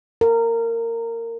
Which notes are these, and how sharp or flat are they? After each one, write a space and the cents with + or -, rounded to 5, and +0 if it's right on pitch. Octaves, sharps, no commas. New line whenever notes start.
A#4 -20